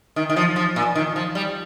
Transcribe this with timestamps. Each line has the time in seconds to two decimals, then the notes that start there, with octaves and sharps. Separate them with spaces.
0.16 D#3
0.29 D#3
0.36 F3
0.56 F3
0.76 A#2
0.95 D#3
1.16 F3
1.35 G3